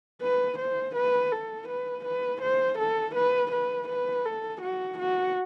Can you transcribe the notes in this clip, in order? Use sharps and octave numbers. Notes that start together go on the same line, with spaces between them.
B4
C5
B4
A4
B4
B4
C5
A4
B4
B4
B4
A4
F#4
F#4